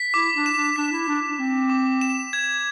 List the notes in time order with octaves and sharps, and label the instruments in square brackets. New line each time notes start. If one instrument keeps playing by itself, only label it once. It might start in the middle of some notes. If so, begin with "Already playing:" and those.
Already playing: [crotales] B6
[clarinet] E4 [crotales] D6
[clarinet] D4
[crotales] E7
[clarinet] D4
[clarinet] D4 [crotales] B6
[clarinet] E4
[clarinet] D4 [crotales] B6
[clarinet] D4
[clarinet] C4 [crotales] B6
[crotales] D6
E7
G#6